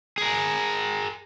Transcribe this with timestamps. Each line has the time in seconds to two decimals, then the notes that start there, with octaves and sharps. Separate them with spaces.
0.18 G#4 A#4